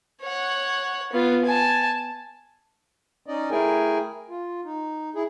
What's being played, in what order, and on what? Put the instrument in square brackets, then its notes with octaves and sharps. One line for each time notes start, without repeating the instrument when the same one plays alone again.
[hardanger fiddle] C#5 F#5
B3 F4
G#5 A5
[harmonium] C#4 D#4 D5 D#5
A3 E4 G#4 A#4 G5 G#5
F4
D#4
E4 G#4